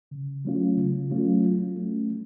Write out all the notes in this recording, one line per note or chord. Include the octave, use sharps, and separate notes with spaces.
C#3
F#3 A3 C#4 F4
C#3
F#3 A3 C#4 F4
F#3
A3 C#4
F#3